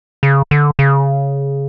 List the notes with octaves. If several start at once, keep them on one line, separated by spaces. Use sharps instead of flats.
C#3
D3
C#3